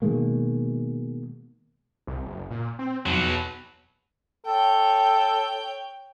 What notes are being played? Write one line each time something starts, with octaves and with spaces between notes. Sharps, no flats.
B2 D#3 G#3 A#3
C2
F#1
A#2
C4
F2 B2 F#3
E2
A4 C#5 G5